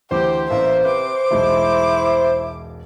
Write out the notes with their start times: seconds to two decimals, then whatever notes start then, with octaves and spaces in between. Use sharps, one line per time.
0.11 D2 E3 G4 C5 D6
0.51 A1 A#3 E5
0.85 C3 B4 D6
1.31 E1 B1 G#3 E4